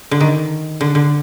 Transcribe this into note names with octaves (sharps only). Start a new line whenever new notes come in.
D3
D#3
D3
D3